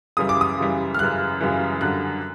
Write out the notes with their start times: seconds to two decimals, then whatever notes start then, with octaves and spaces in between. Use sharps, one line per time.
0.17 F#2 C#3 E3 G3 D#6
0.29 D6
0.41 D#6
0.58 F#2 C#3 E3 G3
0.95 F6
0.98 F#2 C#3 E3 G3 F#6
1.40 F#2 C#3 E3 G3
1.81 F#2 D3 G3 F#6